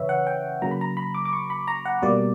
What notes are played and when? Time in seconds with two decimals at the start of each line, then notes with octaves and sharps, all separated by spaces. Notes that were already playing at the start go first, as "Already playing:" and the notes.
Already playing: C#3 E3 B4 C#5 E5
0.09 F#5
0.27 G5
0.62 C#3 F#3 A#3 A#5
0.71 B5
0.81 A#5
0.97 B5
1.15 D6
1.25 D6
1.33 C#6
1.50 B5
1.68 A#5
1.85 F#5
2.02 B2 G3 A#3 D5